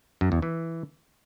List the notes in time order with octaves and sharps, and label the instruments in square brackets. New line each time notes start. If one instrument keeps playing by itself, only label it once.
[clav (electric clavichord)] F#2
E2
E3